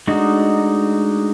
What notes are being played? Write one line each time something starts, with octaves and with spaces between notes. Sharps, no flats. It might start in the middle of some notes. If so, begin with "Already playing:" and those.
G#3 A3 D4 D#4 F#4